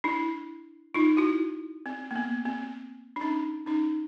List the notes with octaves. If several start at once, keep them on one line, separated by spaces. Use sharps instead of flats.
D4 E4
D#4 F4
E4 F#4
C4
A#3
B3
C4
D4
C#4 D#4
C#4 D#4